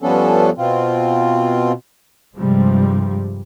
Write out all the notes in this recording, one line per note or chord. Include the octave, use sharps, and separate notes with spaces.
G2 F3 B3 C#4 D4 A4
B2 C4 F4
G2 C3 F3 G3 G#3